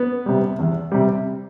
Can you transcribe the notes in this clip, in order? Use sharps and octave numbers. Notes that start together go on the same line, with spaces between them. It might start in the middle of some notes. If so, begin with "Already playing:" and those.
Already playing: B3
C3 G3
E2
C3 G3